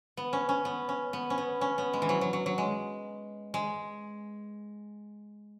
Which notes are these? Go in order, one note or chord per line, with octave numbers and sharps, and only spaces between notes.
B3
C#4
C#4
B3
C#4
B3
C#4
B3
C#4
B3
G#3
E3
F#3
F#3
F#3
F#3
G#3
G#3